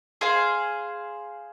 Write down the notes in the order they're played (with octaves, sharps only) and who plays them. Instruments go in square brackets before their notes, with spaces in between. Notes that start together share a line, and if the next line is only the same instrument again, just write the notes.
[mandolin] G#4 C5 F5